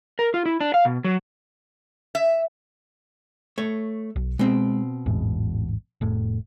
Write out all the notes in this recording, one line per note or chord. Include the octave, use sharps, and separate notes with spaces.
A#4
F4
E4
D4
F5
B2
F#3
E5
A3 C#5
B1
B2 G#3 C4
A1 E2 G#2
F1 A2